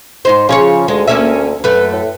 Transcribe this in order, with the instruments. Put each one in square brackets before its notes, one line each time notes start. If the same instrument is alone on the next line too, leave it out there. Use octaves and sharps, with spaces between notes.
[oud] G#2 D#4 C5
[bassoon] C#3 [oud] F3 G#4 C#5
[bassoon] D2 [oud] G#3
[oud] A#3 C#4 E5
[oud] F#2 A3 [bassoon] B4
[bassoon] A2